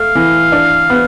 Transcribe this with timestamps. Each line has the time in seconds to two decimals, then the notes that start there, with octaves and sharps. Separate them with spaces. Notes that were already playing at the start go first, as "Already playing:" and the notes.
Already playing: A3 F5
0.15 E3
0.52 D4
0.90 B3